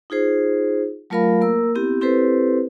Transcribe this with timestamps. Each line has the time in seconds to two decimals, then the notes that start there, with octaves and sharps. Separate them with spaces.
0.10 D#4 F4 G#4 C5
1.10 F#3 A3 F4 A#4 F5 B5
1.41 A#3 A#4 E6
1.75 B3 C4 E4 G4
2.01 C4 E4 G4 A4 B4 C5